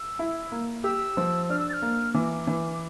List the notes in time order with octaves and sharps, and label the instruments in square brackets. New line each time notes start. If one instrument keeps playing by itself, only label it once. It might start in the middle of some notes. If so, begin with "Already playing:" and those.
Already playing: [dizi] E6
[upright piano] E4
A#3
[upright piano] G4 [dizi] E6
[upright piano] F3
[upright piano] D4 [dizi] F6
[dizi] E6
A6
F6
[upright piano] A#3
[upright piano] E3 [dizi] D6
[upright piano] E3
[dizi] D6